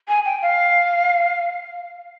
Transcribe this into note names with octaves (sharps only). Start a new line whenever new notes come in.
G#5
G5
F5